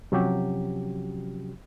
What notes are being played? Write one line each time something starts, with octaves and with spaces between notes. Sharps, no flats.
C3 F3 F#3 C#4 F#4 G4